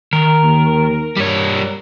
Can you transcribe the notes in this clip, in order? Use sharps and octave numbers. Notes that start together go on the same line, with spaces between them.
D#3 A#4
D#2
G2 G3 C#5